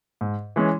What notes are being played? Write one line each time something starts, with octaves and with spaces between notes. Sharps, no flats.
G#2
E3 G#3 C#4